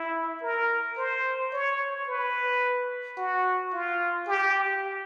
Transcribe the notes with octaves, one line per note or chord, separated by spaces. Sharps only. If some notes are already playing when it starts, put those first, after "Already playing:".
Already playing: E4
A#4
C5
C#5
B4
F#4
F4
G4